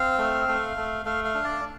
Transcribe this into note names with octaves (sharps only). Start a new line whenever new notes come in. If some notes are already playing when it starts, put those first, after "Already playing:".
Already playing: C4 F5
A3
A3
A3
A3 F5
F5
D4
D5